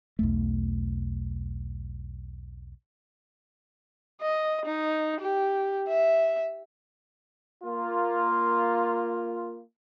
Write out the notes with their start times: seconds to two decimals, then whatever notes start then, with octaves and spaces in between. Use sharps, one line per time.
0.19 B1 E2 A3
4.21 D#5
4.66 D#4
5.21 G4
5.89 E5
7.63 A#3 F4